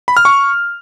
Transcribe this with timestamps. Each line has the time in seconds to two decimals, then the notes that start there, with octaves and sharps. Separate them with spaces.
0.08 B5
0.17 F6
0.25 C#6